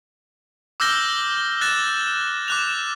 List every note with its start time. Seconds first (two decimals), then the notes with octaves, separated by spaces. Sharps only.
0.80 D6 E6 F6 G6 A#6 G7
1.61 F#6 A6 A#6 E7
2.48 D6 F#6 F7